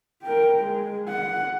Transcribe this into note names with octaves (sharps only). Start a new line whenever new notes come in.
A#4 G5
G#3
F#5